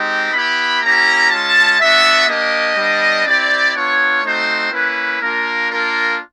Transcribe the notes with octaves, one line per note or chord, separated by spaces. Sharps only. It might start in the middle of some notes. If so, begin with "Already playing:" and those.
Already playing: G#3 C4 D#4 G4
B3 E4 G4 B5
A#3 C#4 E4 G4 A#5
G#3 C#4 F4 A5
B3 D4 F#4 E5
A#3 D4 G4 D#5
G3 B3 D4
C4 E4 G4 D5
B3 D4 F4 C#5
A3 C4 D#4 F#4 C5
A#3 C#4 E4 B4
A#3 D4 F4 A#4
A#3 D4 F4 A#4